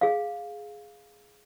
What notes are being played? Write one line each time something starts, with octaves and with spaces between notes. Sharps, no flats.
G#4 F5